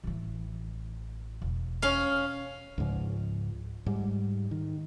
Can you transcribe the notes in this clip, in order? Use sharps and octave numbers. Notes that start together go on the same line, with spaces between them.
A1 E3
E1
C#4 F5
C#2 G#2 F3
G#2 G3
D#3